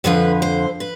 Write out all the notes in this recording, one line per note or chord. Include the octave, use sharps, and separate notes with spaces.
F2 D3 F3 B4
C5
B4